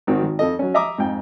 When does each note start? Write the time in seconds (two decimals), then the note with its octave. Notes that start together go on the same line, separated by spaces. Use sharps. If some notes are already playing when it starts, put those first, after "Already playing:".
0.07 G#1 D#3 C4 F#4
0.23 G#1
0.39 F2 A4 D#5
0.59 F#3 C#4
0.74 D#5 E5 A#5 D6 D#6
0.98 F2 G#2 G5